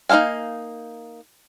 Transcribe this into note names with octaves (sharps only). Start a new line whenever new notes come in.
A#3 D#4 A4 F5 G#5